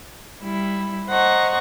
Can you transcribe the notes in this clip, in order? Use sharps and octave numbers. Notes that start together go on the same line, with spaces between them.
G3 E4
C5 D#5 F#5 A#5 C#6